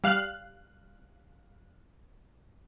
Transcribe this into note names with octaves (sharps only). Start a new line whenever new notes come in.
G3 F5 F#6